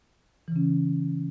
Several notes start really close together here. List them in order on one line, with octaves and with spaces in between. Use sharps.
E3 C#3 C#4